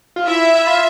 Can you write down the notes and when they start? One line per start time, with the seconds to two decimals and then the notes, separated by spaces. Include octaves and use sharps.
0.16 F4
0.27 E4 E5
0.55 E4
0.67 F4